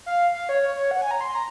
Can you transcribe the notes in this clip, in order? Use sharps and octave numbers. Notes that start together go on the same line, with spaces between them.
F5
F5
C#5
C#5
C#5
F#5
G#5
A#5
C6
A#5